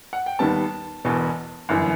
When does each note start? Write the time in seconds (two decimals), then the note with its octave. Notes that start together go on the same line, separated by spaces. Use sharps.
0.13 F#5
0.26 G5
0.39 D#2 D#3 G3 B3 A5
1.05 E1 E2 B2
1.69 G1 F#2 E3